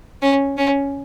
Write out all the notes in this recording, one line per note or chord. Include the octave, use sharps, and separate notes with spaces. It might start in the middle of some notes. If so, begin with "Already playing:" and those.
C#4
C#4